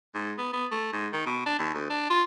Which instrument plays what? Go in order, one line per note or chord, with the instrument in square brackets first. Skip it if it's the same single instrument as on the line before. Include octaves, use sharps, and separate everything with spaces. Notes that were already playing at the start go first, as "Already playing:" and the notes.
[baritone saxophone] G#2
B3
B3
A3
G#2
D#3
B2
D4
D#2
D2
D4
F4